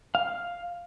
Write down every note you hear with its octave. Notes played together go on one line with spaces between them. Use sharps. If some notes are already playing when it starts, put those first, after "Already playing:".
F5